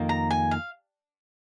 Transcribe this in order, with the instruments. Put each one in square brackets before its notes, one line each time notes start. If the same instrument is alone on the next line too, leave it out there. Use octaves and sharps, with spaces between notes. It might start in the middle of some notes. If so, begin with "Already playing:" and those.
Already playing: [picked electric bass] F2 D#3 A#3
[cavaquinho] A#5
G#5
F5